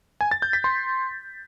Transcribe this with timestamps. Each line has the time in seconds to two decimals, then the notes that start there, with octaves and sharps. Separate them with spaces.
0.21 G#5
0.31 A6
0.42 G6
0.53 B6
0.64 C6